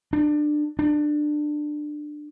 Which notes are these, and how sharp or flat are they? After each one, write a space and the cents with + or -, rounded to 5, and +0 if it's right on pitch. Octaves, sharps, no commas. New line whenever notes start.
D4 +20
D4 +20